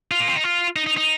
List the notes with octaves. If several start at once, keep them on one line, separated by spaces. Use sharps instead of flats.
F4
A#3
C4
D#4
F4
D#4
D#4
D#4